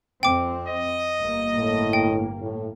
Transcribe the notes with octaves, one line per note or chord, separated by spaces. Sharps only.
F2 C4 G5 D6
D#5
G1 A#3
A2
G5
A2